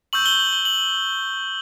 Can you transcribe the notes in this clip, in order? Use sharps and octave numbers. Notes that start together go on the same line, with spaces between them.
C#6 E6 G6 F#7
G7
F#7
G7
F#7